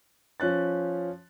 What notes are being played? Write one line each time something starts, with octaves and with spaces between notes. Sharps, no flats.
F3 C#4 F#6 A6